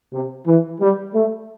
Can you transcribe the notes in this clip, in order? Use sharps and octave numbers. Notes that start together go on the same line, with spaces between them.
C3
E3
G3
A3